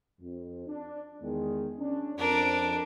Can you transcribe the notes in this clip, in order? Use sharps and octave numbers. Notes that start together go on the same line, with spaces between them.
F2
D4
E2 D#3 G#3
C#4 D4
F2 D4 A#4